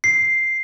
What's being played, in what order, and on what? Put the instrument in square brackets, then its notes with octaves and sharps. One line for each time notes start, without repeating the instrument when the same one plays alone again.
[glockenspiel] C7